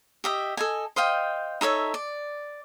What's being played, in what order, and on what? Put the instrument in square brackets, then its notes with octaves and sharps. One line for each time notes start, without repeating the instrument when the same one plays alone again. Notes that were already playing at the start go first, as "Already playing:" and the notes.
[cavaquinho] G4 D#5 E5
A4 D#5 G#5
C5 D#5 F5 G5
D#4 A4 C#5 E5
D5